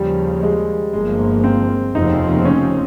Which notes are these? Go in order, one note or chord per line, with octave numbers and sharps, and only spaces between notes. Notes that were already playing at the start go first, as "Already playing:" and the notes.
Already playing: D#2 C#3 F3 G3
G#3
G1 G2 F3 G#3 A#3
C4
F1 D#2 C#3 F3 C4 D#4
C#4